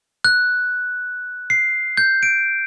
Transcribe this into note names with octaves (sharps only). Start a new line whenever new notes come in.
F#6
C7
G6
D7